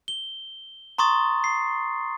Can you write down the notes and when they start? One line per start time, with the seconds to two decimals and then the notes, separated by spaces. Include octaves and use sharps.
0.08 G7
0.98 A#5 C6 C#6 D#6 A6
1.44 C7